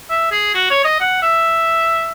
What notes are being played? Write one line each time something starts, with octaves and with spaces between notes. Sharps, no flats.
E5
G#4
F#4
C#5
D#5
F#5
E5